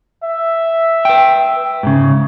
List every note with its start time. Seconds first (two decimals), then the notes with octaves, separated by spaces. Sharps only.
0.24 E5
1.05 B4 G5
1.83 G#2 C#3